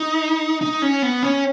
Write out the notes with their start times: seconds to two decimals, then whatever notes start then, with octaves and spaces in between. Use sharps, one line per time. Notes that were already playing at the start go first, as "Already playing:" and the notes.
Already playing: D#4
0.61 D#4
0.82 C#4
1.02 B3
1.23 C#4